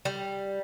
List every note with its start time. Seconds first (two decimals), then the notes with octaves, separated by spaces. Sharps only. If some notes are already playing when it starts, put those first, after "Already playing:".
0.05 G3